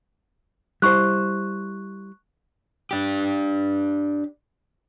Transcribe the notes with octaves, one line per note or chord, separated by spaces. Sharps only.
G3 E4 C5 C#6 F#6
D4 G4